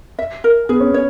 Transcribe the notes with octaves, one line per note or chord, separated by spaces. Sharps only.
E5
A#4
B3 G#4
C#4
B3 C#5